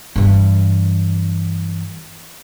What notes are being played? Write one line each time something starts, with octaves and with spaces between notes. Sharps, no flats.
G2 E3